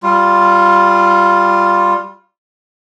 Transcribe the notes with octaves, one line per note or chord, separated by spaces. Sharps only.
G3 F4